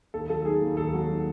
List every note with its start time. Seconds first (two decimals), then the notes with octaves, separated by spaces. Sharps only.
0.14 D#2 A4
0.29 F#3 A4
0.45 D#3 G#4
0.61 D#2
0.77 D#2 A4
0.94 F#3
1.09 D#3